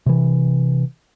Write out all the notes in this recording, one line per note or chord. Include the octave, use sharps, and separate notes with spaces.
C3 E3